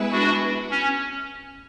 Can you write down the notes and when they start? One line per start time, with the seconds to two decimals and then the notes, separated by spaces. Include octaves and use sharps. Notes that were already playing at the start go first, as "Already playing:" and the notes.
Already playing: G#3 B3 E4 G#4 B4
0.12 D4 F#4
0.71 C#4